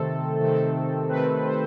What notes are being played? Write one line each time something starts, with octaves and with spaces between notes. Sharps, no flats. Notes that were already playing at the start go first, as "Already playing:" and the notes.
Already playing: C3 D#3 A3 C4 A4
C3 D#3 A3 C4 A4
C3 D#3 A3 C4 B4
C5